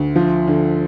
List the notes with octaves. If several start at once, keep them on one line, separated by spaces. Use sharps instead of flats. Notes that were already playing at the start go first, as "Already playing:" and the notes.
Already playing: D2
F3
D3